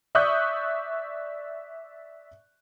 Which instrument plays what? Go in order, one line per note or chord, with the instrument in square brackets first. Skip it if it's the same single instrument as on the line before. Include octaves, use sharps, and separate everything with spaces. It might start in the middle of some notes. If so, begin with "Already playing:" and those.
[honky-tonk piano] D5 E5 C#6 D#6 F#6 G6